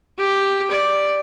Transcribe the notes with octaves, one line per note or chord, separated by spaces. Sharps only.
G4
D5